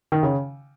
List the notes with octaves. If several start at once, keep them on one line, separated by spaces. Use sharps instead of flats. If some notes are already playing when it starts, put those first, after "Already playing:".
D#3
C#3